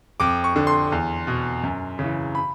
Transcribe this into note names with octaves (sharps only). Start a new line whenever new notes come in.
F2 D6
C#6
D3
C6
E2
B2
F#2
C#3
E3
B5